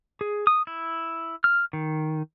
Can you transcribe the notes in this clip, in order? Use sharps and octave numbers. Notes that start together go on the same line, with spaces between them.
G#4
D#6
E4
F6
D#3